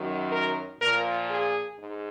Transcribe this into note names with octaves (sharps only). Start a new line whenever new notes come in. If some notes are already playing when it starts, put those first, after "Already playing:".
Already playing: F#2 D#3 F#3
A#4
A#2 F3 A#4
G#4
G#2